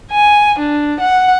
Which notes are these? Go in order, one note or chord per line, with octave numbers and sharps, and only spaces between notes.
G#5
D4
F#5